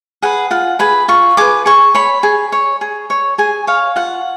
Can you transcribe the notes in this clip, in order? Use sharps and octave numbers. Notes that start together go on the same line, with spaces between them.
G#4 B4 F#5
F4 F#5
G#4 B4 B5
F4 C#6
G#4 B4 D6
G#4 C#6
C#5 B5
G#4
C#5
G#4
C#5
G#4 G#5
C#5 F5
F4 F#5